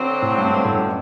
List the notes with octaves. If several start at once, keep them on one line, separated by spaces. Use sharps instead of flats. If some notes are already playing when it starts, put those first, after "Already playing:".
Already playing: D3 F#3 C4
A2
G2
G2
A2
F#2
B2